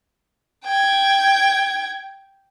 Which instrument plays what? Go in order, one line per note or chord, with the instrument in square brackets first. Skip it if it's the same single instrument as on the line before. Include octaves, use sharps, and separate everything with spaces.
[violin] G5 G#6